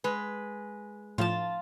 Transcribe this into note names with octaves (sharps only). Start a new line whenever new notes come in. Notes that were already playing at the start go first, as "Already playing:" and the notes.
G#3 B4
A2 F3 F4 A5